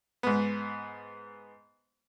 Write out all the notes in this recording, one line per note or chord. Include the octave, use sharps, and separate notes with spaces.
G#2 B3